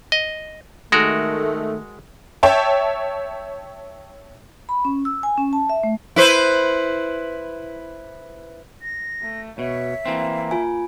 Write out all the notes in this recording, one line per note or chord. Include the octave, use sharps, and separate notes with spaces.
D#5
D#3 G#3 A3 F#4 A#4
C#5 E5 G5 A5
B5
C#4
E6
G#5
C#4
A5
E5
A3
E4 B4 C5
A#6
A3
B2 C#5 E5
E3 A#3 C4
F4 G#5